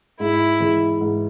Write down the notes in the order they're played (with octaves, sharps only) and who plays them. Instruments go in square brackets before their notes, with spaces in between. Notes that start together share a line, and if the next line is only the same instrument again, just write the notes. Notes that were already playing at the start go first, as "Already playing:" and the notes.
[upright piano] G#2 [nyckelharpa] E4
[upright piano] E3 G#3
G#2